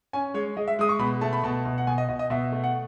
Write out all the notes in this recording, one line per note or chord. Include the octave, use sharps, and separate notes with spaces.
C#4 G#5
G#3 C#5
G#3 D#5
E5
G#3 D#6
C#6
B2 B5
A3 A5
B5
B2 A5
B2
F#5
B2 G#5
D#5
B2 D#5
D#5
B2 E5
A3
F#5